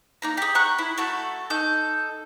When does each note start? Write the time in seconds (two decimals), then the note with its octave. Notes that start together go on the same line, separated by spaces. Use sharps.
0.22 A#3 D#4 A#5
0.37 G4 G#4
0.55 F#5 A#5 C#6 F#6
0.79 E4
0.98 A3 F#4 A4
1.50 D#4 A4 G6